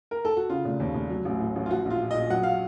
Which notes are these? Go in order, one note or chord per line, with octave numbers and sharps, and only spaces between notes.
A#4
A4
F#4
C#3 F4
F1
D#2
F1
F#3
A1
A2
A1
F4
F3 F#4
A#1
F4
A#2
D#5
A#1
F#3 F#5
F5